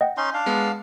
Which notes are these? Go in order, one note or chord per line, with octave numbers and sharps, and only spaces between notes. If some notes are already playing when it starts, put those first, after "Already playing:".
D#5 F#5 G5
C#4 D#4 C6
D4 F5
G#3 B3